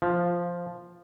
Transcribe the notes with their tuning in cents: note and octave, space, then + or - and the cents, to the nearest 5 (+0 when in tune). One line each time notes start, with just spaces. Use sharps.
F3 +0 F4 +15